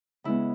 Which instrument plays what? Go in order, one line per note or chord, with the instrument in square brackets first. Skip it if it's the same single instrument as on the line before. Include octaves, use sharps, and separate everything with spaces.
[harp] C#3 G#3 B3 E4